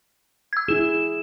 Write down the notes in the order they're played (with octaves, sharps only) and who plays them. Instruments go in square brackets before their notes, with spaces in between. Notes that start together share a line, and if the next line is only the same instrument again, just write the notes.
[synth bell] E6 G#6
[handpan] E4 G#4 [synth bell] E7